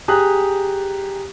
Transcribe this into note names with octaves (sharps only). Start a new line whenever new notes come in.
G4 G#4 A#5 D#6 F#6